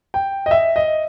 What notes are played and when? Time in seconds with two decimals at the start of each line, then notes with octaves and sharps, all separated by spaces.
0.14 G5
0.46 D#5
0.51 E5
0.76 D#5